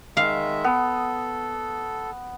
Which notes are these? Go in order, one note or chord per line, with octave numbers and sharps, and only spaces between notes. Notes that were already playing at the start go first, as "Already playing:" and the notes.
D#3 G#3 E5 F5
B3 A4